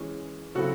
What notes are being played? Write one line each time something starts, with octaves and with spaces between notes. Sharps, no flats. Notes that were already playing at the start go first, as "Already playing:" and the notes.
Already playing: E3 G#3 C#4
C#3 F#3 C4 E4 F#4 A4